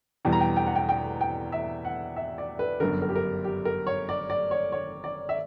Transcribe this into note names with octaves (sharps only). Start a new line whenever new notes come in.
E2 B2 G3 G5
A#5
G5
G5
F#5
G5
G5
G5
E5
F#5
E5
D5
B4
G1 F#2 D3 A#4
A#4
G4
A#4
G4
A#4
C#5
D5
D5
C#5
C#5
D5
E5